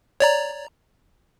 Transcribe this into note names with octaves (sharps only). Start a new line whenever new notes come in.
C#5 D5 A#5